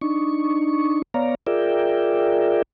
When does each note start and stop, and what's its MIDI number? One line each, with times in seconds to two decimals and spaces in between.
0.02 1.02 62
0.02 1.02 63
0.02 1.02 85
1.14 1.35 59
1.14 1.35 73
1.14 1.35 74
1.14 1.35 77
1.14 1.35 82
1.47 2.62 65
1.47 2.62 68
1.47 2.62 70
1.47 2.62 74
1.47 2.62 76
1.47 2.62 79